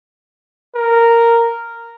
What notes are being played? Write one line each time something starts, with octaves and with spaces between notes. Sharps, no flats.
A#4